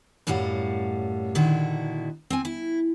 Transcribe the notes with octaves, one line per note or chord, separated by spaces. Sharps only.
F#2 A2 G3 F5 F#5
A#2 D3 D#3 E4 F#4
C4 G#5
E4